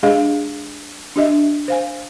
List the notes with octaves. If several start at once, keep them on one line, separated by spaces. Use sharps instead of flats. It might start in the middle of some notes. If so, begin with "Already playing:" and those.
G#3 D4 G4 G#4 D#5 F5
D4 G4 D#5 E5
C5 F5 G#5